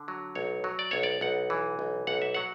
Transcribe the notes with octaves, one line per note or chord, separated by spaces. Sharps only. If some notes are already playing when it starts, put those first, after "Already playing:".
Already playing: D3
F#3
B1 C#5
F#3
D5
B1 C#5
D5
B1 F#5
E3
B1
B1 F#5
E5
F#3 F#5